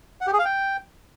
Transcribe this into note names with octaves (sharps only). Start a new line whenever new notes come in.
F#5
G4
G#4
F5
G5